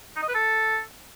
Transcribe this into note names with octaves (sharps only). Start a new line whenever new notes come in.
D#4
D#5
B4
A4